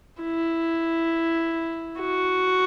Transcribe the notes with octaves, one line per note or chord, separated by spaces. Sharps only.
E4
F#4